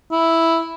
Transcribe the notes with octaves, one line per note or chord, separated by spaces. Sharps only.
E4